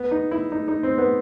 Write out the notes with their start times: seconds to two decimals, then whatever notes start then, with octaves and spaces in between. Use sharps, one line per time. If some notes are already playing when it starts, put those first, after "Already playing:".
Already playing: B3
0.11 D#4
0.31 E4
0.52 D#4
0.68 D#4
0.83 C4
0.98 B3